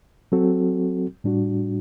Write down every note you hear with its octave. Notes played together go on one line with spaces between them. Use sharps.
F#3 C4 F#4 A4
A2 G3 D4 F#4